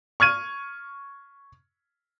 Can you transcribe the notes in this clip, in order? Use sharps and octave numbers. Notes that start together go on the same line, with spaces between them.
C#6 F6 G#6 D#7